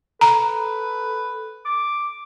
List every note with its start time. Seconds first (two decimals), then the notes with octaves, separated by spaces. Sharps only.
0.21 A4 B4 A#5
1.65 D6